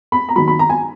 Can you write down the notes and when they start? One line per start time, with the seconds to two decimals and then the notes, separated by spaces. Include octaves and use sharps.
0.12 B5
0.29 A#5
0.36 D#2 D#3 F#3 B5
0.48 B5
0.59 A#5
0.70 G#5